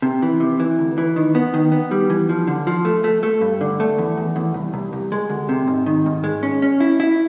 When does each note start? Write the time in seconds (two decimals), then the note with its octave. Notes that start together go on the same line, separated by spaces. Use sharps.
0.02 C3
0.22 E3
0.40 C3
0.60 E3
0.79 D2
0.98 E3
1.16 D#3
1.35 B3
1.54 D#3
1.72 B3
1.91 G3
2.10 E3
2.29 F3
2.47 D3
2.67 F3
2.85 A3
3.04 A3
3.23 A3
3.41 G2
3.61 D3
3.80 A3
3.98 E2
4.17 E2
4.36 E2
4.54 C2
4.74 C2
4.93 C2
5.12 G#3
5.30 D2
5.49 C3
5.67 G#2
5.86 D#3
6.06 G#2
6.24 G#3
6.43 C#4
6.62 C#4
6.80 E4
7.00 E4